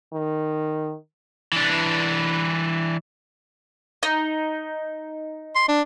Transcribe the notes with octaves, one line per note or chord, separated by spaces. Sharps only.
D#3
E3 D4
D#4
C6
D4